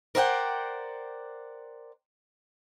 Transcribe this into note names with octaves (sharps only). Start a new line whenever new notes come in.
A#4 C5 D5 E5 F#5 G5